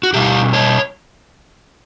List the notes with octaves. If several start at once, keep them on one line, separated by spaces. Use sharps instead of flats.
F#4
B2 G3 G4
C#5